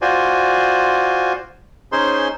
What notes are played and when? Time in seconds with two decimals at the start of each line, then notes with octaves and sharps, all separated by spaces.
0.02 F4 F#4 C5 D5 G#5
1.92 C#4 D#4 G#4 C5 C6